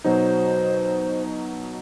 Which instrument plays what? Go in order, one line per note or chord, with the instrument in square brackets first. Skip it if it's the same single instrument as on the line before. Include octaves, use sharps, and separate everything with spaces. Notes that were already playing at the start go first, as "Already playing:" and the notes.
[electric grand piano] B2 F#3 D#4 [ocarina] C5